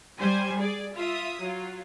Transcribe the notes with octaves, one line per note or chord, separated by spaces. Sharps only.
G3 C5 G#5
G#4 D5
F4 E5 D#6
F#3 F4